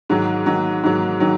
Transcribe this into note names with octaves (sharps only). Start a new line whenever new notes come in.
G#2 D#3 F#3
G#2 D#3 F#3
G#2 D#3 F#3
D#3 F#3